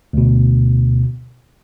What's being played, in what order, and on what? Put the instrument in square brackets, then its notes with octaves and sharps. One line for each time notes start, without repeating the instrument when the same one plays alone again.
[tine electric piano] D2 B2